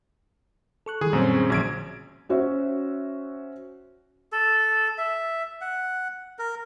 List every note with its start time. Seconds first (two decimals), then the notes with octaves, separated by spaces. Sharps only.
0.86 A4 C#6 F#6
1.01 D#3 E3 G3 G#4
1.13 F#2 A#2 G3 C4 C#4
1.34 G#4 C5
1.50 A#1 D3 F#3 G#6 D7
2.29 C#4 F#4 C5 E5
4.32 A4
4.98 E5
5.61 F#5
6.39 A#4